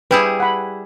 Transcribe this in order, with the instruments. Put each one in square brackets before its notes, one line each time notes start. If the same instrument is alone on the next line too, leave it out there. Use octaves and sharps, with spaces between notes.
[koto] G3 E4 G#4 [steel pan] B4 G5
[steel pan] F#5 B5